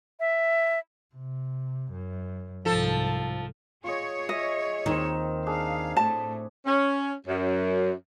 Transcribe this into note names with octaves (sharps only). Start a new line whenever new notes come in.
E5
C3
F#2
C2 G#2 F3 A4
F4 G#4 C#5 D#5
D#5 E5
D#2 D#3 C4 D#4
D4 G#4 F5
A2 A3 A5
C#4
F#2